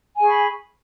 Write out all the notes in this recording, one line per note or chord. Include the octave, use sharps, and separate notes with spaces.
G#4 G#5 B5 C#6